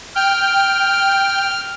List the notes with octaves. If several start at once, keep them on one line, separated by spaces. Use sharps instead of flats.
G5 F6